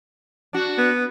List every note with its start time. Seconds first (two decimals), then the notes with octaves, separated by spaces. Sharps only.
0.53 D4 F#4
0.78 B3